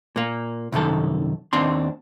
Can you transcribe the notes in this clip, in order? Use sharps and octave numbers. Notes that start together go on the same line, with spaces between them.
A#2 A#3
C2 F#2 D#3 A4
D#2 C4 D4 C6